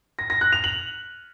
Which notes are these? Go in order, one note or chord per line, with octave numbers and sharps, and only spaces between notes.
A#6
A#6
F#6
F7
F#7